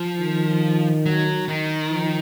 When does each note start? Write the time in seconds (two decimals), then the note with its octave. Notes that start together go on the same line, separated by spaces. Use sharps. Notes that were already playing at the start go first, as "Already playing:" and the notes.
Already playing: F3
0.20 D#3
1.06 F#3
1.48 D#3
1.91 F3